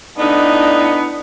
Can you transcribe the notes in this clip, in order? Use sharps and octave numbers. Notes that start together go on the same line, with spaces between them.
A2 B3 D4 D#4